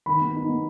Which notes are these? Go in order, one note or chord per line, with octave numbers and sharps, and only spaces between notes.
D#3 B5
B3
D#4
B3